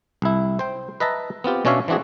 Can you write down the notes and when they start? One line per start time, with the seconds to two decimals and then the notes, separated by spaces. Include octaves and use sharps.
0.22 C2 E4
0.59 C5 G5
1.00 B4 D#5 E5 A5 A#5
1.44 B3 C4 F4 G4
1.65 B2 C#4 D4 C#5 E5 F5
1.88 E3 C4 D4 F#4 G#4